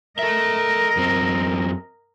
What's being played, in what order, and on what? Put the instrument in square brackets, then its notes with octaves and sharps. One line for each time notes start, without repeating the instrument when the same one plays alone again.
[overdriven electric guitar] A4 E5 [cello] A#4 D#5
[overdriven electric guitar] F#2 C4